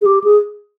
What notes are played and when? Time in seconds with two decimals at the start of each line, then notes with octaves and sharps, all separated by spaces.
0.01 G#4
0.05 G4
0.24 G#4